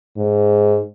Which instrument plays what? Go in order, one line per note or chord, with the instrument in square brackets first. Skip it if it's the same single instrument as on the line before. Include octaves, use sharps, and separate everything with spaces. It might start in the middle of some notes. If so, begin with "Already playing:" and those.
[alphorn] G#2